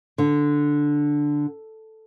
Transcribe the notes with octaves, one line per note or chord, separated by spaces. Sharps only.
D3